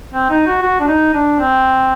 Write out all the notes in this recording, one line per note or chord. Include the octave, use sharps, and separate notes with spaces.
C4
D#4
F#4
F#4
D4
D#4
D4
C4